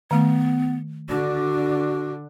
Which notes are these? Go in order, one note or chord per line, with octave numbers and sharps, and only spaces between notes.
D#3 A3 B3
D3 D4 F#4